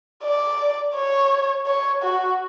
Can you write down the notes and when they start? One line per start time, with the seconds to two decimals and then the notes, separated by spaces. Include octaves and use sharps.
0.24 D5
0.96 C#5
1.66 C#5
2.03 F#4